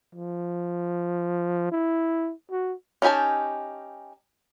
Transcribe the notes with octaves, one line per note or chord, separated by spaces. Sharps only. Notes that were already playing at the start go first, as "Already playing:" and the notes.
F3
E4
F#4
C#4 D#4 G4 G#5 A5